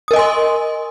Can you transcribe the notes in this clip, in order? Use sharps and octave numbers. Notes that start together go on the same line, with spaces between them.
A#4 D#5 G#5 C6 D#6